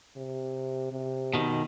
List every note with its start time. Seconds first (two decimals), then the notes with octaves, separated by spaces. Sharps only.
0.17 C3
0.92 C3
1.33 B2 D#3